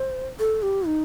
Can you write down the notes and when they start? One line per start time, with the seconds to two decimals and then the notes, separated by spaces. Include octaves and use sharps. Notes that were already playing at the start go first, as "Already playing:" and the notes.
Already playing: C5
0.40 A4
0.62 G4
0.87 D#4